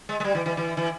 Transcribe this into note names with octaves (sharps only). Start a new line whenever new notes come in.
G#3
G#3
G3
E3
E3
E3
E3